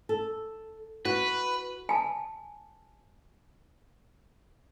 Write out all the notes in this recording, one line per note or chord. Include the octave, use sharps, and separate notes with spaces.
A4
F#4 B4
G#5 A5